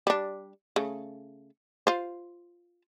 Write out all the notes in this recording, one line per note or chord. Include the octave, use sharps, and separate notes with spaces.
G3 D4
C#3 A3
F4 C5